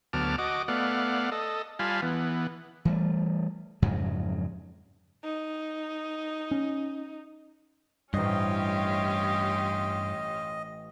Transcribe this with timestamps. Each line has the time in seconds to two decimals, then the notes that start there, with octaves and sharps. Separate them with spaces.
0.13 D2 F#3 B3 A5 D6 F6
0.38 F#4 D#5 D6
0.68 A3 B3 D5 F5 F#5
1.32 A4 D#5
1.79 G3 F4 F5 G#5 A5 B5
2.02 E3 B3
2.85 E3 G3 A3
3.82 F2 G#2 C#3 F#3
5.24 D#4
6.51 C#4
8.14 A1 G2 C#4 F4 G4 C5 D#5